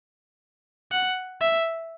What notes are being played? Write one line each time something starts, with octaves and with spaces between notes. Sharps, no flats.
F#5
E5